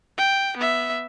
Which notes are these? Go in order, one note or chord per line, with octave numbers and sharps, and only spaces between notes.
G5
B3 E5